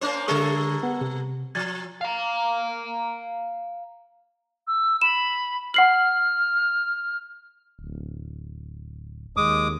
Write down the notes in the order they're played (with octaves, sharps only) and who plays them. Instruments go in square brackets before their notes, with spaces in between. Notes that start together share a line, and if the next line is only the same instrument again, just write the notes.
[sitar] A#3 C#4 C5
[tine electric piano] D3 C#6 [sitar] G3 A4 A#4
[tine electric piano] B3
C3
[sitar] F3 [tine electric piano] G#6 A6
[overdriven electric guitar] F5 A#5
[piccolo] E6
[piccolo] B5 [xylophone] E7
[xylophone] F#5 C7 F#7 [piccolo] F6
[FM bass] D1
[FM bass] D#2 [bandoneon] G#3 D6 D#6